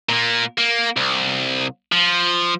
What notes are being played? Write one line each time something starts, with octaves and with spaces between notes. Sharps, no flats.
A#2 A#3
A#3
C2
F3